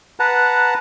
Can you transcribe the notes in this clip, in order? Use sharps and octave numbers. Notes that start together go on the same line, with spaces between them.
B4 F#5 A5 A#5